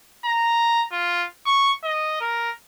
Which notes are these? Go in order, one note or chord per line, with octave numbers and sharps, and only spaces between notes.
A#5
F4
C#6
D#5
A#4